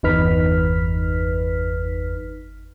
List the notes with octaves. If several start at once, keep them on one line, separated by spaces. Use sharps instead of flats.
G1 E2 D#4 B4 F6 B6